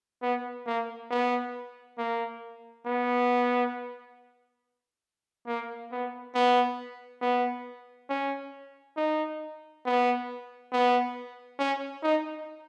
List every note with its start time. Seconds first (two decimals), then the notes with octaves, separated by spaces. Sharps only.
0.22 B3
0.66 A#3
1.10 B3
1.98 A#3
2.85 B3
5.47 A#3
5.92 B3
6.35 B3
7.22 B3
8.09 C#4
8.97 D#4
9.85 B3
10.72 B3
11.59 C#4
12.03 D#4